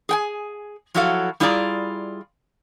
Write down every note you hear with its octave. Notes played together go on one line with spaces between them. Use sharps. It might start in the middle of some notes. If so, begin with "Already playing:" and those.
G#4 G5 G#5
F3 F#3 E4 F#4 A4 F5
G3 E4 F4 G#4 D5 A#5